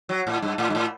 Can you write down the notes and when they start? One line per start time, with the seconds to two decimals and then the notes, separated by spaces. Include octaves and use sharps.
0.09 F#3
0.27 A2
0.42 G2
0.58 A2
0.70 G2
0.75 A2